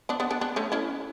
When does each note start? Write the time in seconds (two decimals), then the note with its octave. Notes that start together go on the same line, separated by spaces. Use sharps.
0.09 B3 D4
0.20 B3 D4
0.31 B3 D4
0.41 B3 D4
0.56 A3 C#4
0.72 C#4 E4